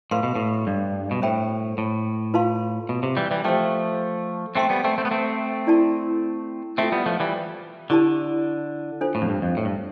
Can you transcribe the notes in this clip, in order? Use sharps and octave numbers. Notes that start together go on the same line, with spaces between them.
A2 B4 F5 C6
B2
A2
G2
B2
A2 C5 E5 G5 B5
A2
F4 B4 F5 A5 C6
B2
C3
E3 G3
E3 G3
F3 A3 G4 C5 E5 G5
A3 C4 C5 G5 C6
G3 B3
A3 C4
A3 C4
B3
A3 C4
E4 A4 D5 A5
A3 C4 F4 A4 E5
G3 B3
F3 A3
E3 G3
D3 E4 G4 D5 A5
D4 F4 A4 C5
A2
F2
G2
F2
A2
G2